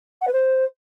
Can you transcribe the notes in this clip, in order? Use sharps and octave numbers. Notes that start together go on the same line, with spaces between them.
F#5
B4
C5